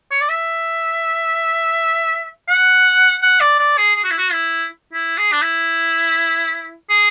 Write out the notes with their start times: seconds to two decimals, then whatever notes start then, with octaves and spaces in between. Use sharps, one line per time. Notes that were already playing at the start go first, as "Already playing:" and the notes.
0.11 C#5
0.21 D5
0.29 E5
2.49 F#5
3.23 F#5
3.40 D5
3.59 D5
3.78 G#4
3.96 G#4
4.04 F#4
4.11 E4
4.18 F#4
4.32 E4
4.93 E4
5.18 G#4
5.32 D4
5.42 E4
6.90 G#4